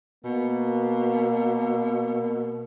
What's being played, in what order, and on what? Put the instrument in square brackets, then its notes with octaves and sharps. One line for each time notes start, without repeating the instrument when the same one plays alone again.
[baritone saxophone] B2 [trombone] A#3